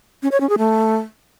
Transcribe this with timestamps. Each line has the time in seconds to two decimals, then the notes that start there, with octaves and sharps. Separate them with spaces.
0.23 C#4
0.32 C#5
0.40 C#4
0.49 G#4
0.58 A3